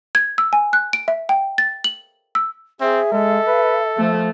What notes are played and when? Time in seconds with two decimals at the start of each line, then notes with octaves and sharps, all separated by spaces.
0.15 G#6
0.38 E6
0.53 G#5
0.73 F#6
0.93 D7
1.08 E5
1.29 G5
1.58 A6
1.84 F#7
2.35 E6
2.81 C4 G#4 E5
3.12 G#3 A4
3.47 B4
3.98 F3 A3